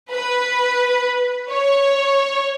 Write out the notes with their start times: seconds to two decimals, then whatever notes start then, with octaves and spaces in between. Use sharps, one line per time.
0.12 B4
1.50 C#5